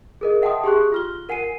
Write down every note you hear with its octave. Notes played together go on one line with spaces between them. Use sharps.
G#4 A#4 D#5
E5 F#5 G5 A5 C6 D#6
G4 G#4 C6 C#6 F#6
F4 F6 G7
A#4 F#5 G#5 C7 D#7